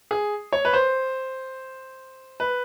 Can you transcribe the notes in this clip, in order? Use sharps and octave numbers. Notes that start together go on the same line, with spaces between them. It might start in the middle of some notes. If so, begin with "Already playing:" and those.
G#4
C#5
B4
C5
B4